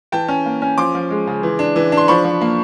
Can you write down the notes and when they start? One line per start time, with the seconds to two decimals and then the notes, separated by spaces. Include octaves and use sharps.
0.12 E3 G5 A5
0.28 C#4
0.46 A#3
0.62 C#4
0.77 F3 C6 D6
0.95 F3
1.10 G#3
1.27 C#3
1.43 E3
1.59 D4
1.76 E3
1.92 D4
1.97 C6
2.08 F3 B5 C#6
2.24 F3
2.41 A#3